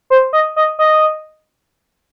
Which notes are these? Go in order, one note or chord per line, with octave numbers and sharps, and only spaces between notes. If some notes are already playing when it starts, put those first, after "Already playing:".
C5
D#5
D#5
D#5